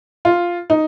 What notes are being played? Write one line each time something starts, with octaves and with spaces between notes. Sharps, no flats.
F4
D#4